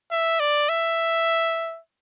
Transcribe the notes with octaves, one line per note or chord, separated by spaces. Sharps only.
E5
D5
E5